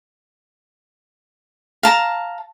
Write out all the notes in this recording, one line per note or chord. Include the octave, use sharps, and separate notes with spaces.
F5 A5 A#5